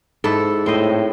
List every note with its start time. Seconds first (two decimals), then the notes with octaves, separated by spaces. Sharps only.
0.24 G#2 E4 A4
0.66 A2 C4 C5 D#5